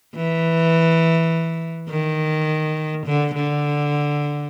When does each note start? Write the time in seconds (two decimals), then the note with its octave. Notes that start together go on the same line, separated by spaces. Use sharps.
0.15 E3
1.90 D#3
3.06 D3
3.35 D3